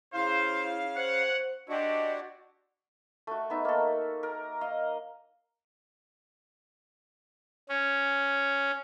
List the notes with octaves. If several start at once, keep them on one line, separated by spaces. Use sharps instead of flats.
C#3 E4 C5 F5
C5 C#5 F#5
C4 D4 E4 F#4 G4 D#5
A3 F#4
B3 D#4 E5
A#3 A4
A#4
D#5 F5
C#4